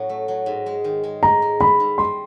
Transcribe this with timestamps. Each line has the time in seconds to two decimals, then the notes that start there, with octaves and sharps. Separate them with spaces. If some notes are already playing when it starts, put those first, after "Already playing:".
Already playing: A2 F#3 C#4
0.09 A3
0.28 F#3
0.46 G#2
0.66 G#3
0.84 D#3
1.04 G#3
1.23 G#2 A#5
1.42 G#3
1.60 G#2 B5
1.80 G#2
1.98 G3 C6